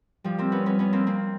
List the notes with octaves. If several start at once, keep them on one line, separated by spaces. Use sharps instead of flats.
F3 G3
A#3 C4
B3 C#4
B3 C#4
B3 C#4
A#3 C4
A#3 C4